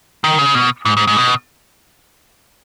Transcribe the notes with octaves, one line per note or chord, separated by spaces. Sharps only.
D#3
C#3
B2
G#2
G#2
G#2
B2